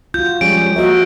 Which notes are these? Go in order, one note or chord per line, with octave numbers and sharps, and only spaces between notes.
F4 F#4 G6
F3 G3 G#3 C#4 D7
A#3 F#4 D#5 E5